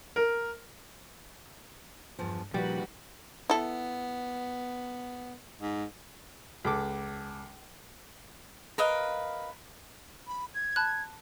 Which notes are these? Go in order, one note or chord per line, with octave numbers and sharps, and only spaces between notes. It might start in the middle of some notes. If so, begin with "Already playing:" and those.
A#4
E2 G2 F3
A#2 D#3 F3 G3 F#4 B4
B3 E4 A4
G#2
C#2 A4 D6
A#4 B4 D#5 F5
B5
G#6
A5 B5 F#6